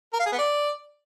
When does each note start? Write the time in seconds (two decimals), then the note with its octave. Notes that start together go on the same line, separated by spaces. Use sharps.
0.13 A#4
0.20 F5
0.26 G#4
0.32 B3
0.39 D5